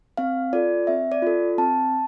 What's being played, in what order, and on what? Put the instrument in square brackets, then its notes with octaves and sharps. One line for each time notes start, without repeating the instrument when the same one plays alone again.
[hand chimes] C4 F5
F4 A4 D5
C4 E5
D5
F4 A4
C4 A5